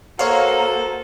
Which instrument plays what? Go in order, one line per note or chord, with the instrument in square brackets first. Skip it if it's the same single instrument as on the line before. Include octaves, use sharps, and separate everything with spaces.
[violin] A#3 F#4 [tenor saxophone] A4 [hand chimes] C5 A#5 C6 [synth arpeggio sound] C#5 F5